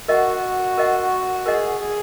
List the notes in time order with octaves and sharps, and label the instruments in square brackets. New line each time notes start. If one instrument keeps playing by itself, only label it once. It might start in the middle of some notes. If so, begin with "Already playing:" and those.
[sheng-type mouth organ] F#4 [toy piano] A#4 D#5 F#5
[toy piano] A#4 D#5 F#5
[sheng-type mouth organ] G#4 [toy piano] A#4 D#5 F#5
[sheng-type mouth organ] G#4